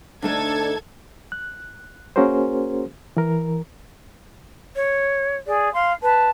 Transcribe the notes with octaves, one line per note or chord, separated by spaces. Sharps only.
D2 A3 D4 D#4 A4 G#6
F#6
A#3 C#4 F#4 G#4 A#4 C5
E3 A#4
C#5
G#4 D5
F5 C6
B4 A5